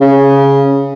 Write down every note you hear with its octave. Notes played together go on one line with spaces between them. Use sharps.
C#3